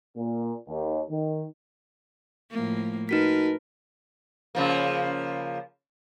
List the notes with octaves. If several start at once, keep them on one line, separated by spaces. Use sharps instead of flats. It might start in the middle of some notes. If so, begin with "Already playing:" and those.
A#2
D#2
D#3
A2 F3 A#3
D#4 F#4 A#4 B4 B6
C#3 F3 A#3